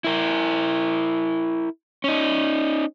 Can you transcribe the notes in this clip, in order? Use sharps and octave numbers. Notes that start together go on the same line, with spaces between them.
E4 A#4
C#4 D#4